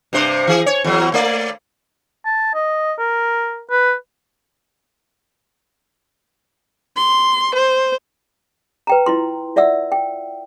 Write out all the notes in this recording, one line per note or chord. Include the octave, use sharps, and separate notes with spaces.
G2 C3 C5
E3 G#4
C#5
E2 F#3
A3 D5
A5
D#5
A#4
B4
C6
C5
B4 G5 A#5
E4 F4 C6
F4 D5 E5 F#5 E6
G5